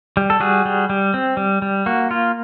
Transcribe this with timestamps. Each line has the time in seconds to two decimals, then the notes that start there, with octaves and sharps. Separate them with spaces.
0.17 G3
0.30 A4
0.40 G3 F#4 G#4
0.65 G3
0.90 G3
1.14 C4
1.37 G3
1.62 G3
1.86 A#3 F#4
2.11 F4